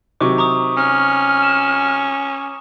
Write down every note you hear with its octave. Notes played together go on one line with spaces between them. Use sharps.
C3 D#3 F#3 C#6 D6
A#5 C#6 D#6
C#4 F6
E7